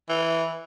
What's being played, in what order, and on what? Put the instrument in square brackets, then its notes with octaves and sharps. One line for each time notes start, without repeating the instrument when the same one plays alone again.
[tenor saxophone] E3